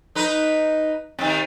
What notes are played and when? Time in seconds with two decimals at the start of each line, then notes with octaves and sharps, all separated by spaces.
0.15 D#4 B4
1.19 C3 D#3